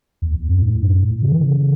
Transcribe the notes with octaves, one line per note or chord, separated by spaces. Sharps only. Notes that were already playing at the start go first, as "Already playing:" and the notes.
E2
E2
F#2
A2
F#2
A2
C#3
E3
C#3